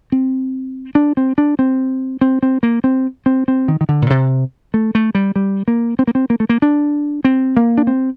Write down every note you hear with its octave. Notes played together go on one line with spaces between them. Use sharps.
C4
D4
C4
D4
C4
C4
C4
A#3
C4
C4
C4
D#3
D#3
D3
A#2
C3
A3
A3
G3
G3
A#3
C4
A#3
C4
A#3
A3
A#3
D4
C4
A#3
D4
C4